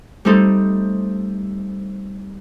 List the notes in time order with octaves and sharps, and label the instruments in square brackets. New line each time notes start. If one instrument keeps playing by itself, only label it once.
[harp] G3 A3 C4 D#4 A4